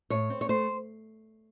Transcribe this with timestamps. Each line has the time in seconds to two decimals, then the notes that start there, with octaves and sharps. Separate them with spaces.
0.10 A2 C#5
0.30 C4
0.41 C#5
0.49 A3 C5